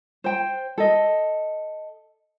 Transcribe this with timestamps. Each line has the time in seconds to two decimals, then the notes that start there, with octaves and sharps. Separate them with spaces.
0.24 C5 G5
0.78 A4 D#5